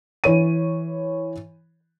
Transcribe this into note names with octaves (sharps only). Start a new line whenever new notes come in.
E3 C#5 D#7